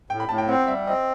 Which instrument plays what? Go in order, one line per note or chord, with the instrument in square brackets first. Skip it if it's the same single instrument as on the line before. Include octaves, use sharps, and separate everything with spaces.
[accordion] A2 [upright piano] G5
[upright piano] B5
[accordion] A2 [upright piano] A5
[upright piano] G5
[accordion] C4 [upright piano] F#5
[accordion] G3 [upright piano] E5
[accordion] C4 [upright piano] D#5